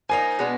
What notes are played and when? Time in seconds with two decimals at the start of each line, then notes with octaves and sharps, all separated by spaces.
0.09 F3 A#3 D#4 G#5
0.39 B2 G#3 B3 D4